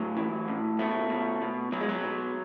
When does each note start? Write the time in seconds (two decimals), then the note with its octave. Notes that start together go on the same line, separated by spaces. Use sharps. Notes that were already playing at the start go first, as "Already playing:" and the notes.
Already playing: A2 F#3
0.17 E3
0.48 A2
0.79 B2 A3
1.10 B2
1.42 B2
1.72 B2 F#3
1.81 G#3
1.89 F#3
2.04 B2